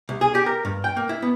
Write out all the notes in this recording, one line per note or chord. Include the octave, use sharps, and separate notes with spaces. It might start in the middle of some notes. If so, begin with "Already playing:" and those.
C2
G#4
G4
A#4
G2
G5
A#3
E4
B3